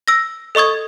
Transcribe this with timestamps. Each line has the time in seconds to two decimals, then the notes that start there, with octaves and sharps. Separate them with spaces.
0.08 E6 A#6
0.55 A4 D#5 C#6 D#6 G#6